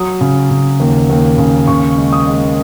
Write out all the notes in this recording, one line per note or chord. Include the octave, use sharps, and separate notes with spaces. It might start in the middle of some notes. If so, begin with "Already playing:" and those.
Already playing: F#3 D#6
C#3
C#3
D#2
D#2
C#3
C#3 C#6
G#3
D#6
G#3